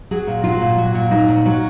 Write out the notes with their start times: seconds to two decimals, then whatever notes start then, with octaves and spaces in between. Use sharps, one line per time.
0.11 F#3 G#4
0.27 A#2
0.44 F#3 F4
0.61 A#2
0.78 F#3
0.95 A#2
1.11 F#3 D#4
1.28 A#2
1.46 F#3